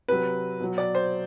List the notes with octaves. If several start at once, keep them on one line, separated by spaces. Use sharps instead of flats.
C3 F#3 B4
B2 F#3
D5
C5